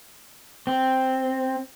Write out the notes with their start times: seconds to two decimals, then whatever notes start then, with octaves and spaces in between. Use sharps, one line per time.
0.67 C4